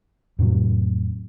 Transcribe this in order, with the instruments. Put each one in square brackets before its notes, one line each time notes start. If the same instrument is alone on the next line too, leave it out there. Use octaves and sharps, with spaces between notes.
[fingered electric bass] F2 A2 C3 F#3